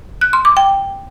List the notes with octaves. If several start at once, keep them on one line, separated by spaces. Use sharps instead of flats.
F#6
C6
D6
G5